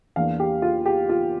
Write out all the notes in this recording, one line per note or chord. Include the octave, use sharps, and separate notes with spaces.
E2 E3 A#3 D4 F5
G4
F4
G4
F4